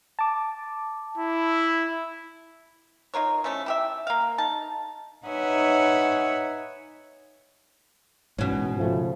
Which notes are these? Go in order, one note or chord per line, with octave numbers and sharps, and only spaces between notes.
A5 D6
E4
D#4 F4 A#4 C#5
F3 A3 C#4 E4
E4 G4 E5
A#3 F5
D#4 A5
D#4 B4 C#5 E5 F#5 G#5
A1 G#2 B2 C#4
C#3 F3 A3